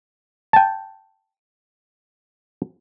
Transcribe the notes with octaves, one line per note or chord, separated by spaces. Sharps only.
G5 A5